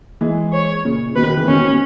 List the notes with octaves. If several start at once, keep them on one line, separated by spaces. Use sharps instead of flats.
E3 G#3
C#5
A#2 C#3
B2 D#3 B4
B2 D#3
C#3 E3
B2 D#3 C#4
B2
B2